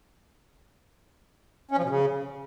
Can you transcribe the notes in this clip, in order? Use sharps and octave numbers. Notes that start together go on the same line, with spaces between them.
C#4
F3
B2
C#3